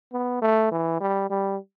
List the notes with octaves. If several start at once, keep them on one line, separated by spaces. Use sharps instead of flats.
B3
A3
E3
G3
G3